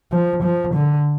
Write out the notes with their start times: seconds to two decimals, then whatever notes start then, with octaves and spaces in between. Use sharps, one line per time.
0.12 F3
0.43 F3
0.74 D3